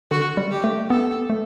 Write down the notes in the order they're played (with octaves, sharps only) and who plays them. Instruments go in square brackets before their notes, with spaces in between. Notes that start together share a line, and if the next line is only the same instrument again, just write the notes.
[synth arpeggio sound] D3 [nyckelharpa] F#4
[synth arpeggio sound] G3
[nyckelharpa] G4
[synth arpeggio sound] A3
[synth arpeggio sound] B3 [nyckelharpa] A4
[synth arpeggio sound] A3